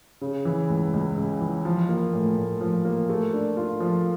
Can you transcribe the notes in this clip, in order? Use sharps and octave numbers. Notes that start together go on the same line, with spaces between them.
C#3
E3
C#2
C#2
C#3
E3
F3
A#3
A2
A2
F3
A#3
A3
D4
F4
F3